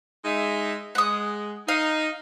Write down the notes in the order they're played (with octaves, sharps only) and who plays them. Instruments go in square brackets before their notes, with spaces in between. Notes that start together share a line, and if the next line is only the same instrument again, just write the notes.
[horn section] G#3 D#4 E5
[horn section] G#3 [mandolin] F#5 D#6
[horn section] D#4 [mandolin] F5